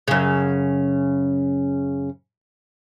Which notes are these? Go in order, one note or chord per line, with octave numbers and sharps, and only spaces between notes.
F#2 C#3